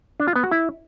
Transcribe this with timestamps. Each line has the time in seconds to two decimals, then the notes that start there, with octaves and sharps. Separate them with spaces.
0.20 D4
0.28 F4
0.36 B3
0.44 F#4
0.51 E4